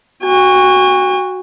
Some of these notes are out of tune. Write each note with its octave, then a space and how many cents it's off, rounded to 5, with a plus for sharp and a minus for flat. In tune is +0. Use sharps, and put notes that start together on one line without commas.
F#4 +0 G#5 -45